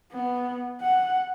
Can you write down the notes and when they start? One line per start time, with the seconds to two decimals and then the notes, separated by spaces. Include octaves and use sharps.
0.13 B3
0.82 F#5